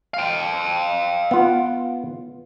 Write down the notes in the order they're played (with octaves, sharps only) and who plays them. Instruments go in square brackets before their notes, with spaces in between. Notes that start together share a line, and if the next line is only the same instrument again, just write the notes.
[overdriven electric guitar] F5 G5
[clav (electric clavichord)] B3 F4